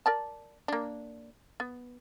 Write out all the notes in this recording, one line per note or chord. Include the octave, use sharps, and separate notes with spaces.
A#4 D5 A5
A#3 D4
B3